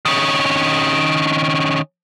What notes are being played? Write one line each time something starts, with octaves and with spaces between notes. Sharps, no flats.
D#3 C#4